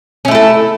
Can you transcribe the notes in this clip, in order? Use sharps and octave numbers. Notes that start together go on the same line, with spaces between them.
A3 C#4 E4 A4